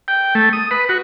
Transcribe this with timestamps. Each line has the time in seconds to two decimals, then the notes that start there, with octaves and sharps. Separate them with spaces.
0.08 G5
0.35 A3
0.53 D#6
0.71 B4
0.89 F#4